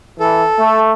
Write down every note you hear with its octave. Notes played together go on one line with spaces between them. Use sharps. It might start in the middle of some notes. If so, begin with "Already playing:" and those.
E3 A4
A3